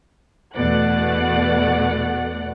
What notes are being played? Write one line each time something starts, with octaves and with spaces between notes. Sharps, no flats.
E2 B2 A3 D5 F#5 F#6